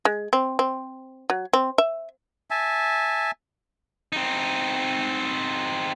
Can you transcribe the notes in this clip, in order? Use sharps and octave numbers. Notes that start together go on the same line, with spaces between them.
G#3
C4
C4
F#3
C4
E5
E5 G#5 A5
C4 D#4